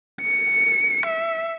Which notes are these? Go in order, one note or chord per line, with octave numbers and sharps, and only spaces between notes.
C#7
E5